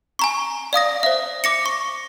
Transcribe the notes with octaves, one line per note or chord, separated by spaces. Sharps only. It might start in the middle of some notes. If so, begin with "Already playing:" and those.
G#5 A#5 C#6
D5 F5 D#6 A#6
C5 E5
D6 A#6 C#7
C#6